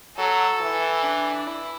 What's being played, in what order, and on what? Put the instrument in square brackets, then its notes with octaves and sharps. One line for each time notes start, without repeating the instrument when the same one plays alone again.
[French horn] F#3 [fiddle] A4
[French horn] E3
[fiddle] D4
E4